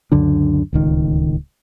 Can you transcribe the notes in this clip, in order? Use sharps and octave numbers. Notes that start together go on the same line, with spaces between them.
C#2 F#2 D3 D4
D1 C#2 D#3